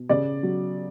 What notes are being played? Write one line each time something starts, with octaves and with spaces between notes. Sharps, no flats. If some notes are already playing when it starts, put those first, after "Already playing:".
Already playing: B2
C#3 D5
F#3